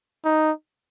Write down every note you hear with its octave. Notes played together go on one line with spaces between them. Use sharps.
D#4